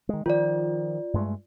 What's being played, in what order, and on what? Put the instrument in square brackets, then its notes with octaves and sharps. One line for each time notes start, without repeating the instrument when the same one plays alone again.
[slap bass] D#3 G#3
[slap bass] D#3 F3 [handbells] F4 D5
[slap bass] G2 G#3 A3